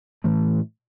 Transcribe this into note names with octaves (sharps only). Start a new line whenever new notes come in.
A2 E3 A3